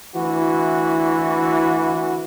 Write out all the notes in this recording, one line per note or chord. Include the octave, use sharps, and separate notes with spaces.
D2 E3 E4 F#4